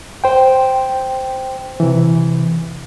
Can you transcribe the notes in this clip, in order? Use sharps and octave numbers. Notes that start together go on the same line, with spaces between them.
C5 G5
C3 E3